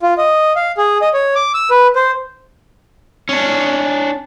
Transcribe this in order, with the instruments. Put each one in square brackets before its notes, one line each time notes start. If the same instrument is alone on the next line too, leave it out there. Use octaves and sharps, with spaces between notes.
[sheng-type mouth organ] F4
D#5
F5
G#4
D#5
C#5
D6
E6
B4
C5
[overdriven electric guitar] C#4 D4